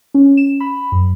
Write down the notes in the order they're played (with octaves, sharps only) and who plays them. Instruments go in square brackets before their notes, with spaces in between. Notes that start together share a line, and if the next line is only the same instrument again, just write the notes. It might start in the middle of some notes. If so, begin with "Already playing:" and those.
[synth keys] C#4
E7
B5
F#2